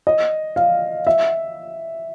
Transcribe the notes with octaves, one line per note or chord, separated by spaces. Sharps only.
D#5
F5
E5